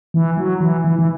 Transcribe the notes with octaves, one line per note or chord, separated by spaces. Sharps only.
E3
F#3
E3
E3
E3